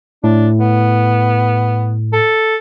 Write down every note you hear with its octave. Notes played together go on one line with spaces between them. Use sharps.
A2 D4
B3
A4